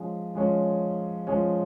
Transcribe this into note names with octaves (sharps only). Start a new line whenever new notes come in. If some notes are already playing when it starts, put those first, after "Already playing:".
Already playing: F3 G#3 C#4
F3 G#3 C#4
F3 G#3 C#4